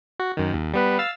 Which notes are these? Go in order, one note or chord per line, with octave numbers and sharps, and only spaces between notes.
F#4
F#2 D#3
D#2
G3 B3 B4
F5 E6 A6